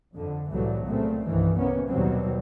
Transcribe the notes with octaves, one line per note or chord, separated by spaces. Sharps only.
F2 D3
C2 A2 E3 F#3 G3 A3
A#2 C#3 A3 C4
C2 G2 D#3 E3
C3 A#3 B3 C#4
D#2 B2 D#3 F#3 G3 C4